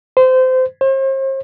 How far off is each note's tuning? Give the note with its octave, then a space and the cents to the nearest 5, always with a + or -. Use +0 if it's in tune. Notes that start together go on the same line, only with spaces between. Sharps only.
C5 -25
C5 +40